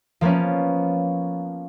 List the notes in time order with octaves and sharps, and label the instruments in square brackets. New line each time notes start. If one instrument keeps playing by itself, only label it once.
[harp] F3 A#3 B3 C#4